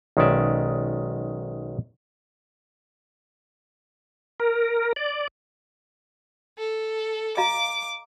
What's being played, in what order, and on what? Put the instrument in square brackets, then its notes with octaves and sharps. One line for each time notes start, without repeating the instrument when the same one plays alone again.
[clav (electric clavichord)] B1 D#3 G#3 C#4 D5 E5
[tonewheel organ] A#4
D5
[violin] A4
[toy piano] D#5 F5 A#5 [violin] D6